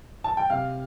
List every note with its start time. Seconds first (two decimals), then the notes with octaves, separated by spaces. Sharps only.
0.24 A5
0.37 G5
0.50 C3 F5